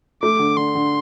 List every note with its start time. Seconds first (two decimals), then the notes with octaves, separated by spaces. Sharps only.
0.23 A3 D6
0.39 D3
0.57 D3 C6
0.75 D3